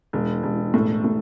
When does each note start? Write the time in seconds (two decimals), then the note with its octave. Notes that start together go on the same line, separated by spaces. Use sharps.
0.13 E1
0.43 E1
0.74 A2
1.04 A2